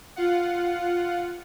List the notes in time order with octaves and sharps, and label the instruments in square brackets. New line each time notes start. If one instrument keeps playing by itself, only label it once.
[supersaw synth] F4 F5 F#5